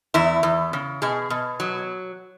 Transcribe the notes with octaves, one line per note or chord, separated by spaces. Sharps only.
E2 E4
E2
C#3
B2 G#4
B2
F#3